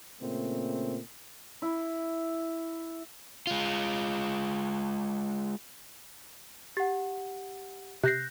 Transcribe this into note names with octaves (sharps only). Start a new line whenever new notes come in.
A#2 C#3 A3 C4
E4
G#3 F4
G4 F#5 A6
C3 F#6 G6 A#6 C7